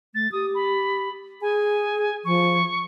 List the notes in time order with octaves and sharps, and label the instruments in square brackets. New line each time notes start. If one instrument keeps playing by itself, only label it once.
[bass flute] A3 [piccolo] A6
[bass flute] G4 [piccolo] D#6
[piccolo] B5
[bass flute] G#4 [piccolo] G#5
[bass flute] F3 [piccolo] C#6